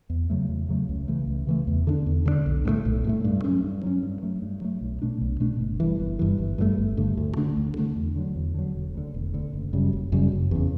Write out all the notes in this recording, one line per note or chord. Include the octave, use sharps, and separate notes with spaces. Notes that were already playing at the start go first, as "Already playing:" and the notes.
E2
C#3 F#3 A3
E2
C#3 F#3 A3
C#2
C#3 E3 A3
C#2
C#3 E3 A3
E2
D3 A3 D4
E2
D3 A3 D4
B1
A2 F#3 A3
B1
A2 F#3 A3
G2
F#3 C#4
G2
F#3 C#4
G2
F#3 A3
G2
F#3 A3
B1
B2 A3 D4
B1
B2 A3 D4
G1
G2 E3
G1
G2 E3
G1
G2 D3 A3
G1
G2 D3 A3
D2
D3 A3 D4
D2
D3 A3 D4
E2
D3 F#3
E2
D3 F#3
E1
D2 D3
E1
D2 D3
F#1
F#2 C#3 G3
F#1
F#2 C#3 G3
F#1
E2 C#3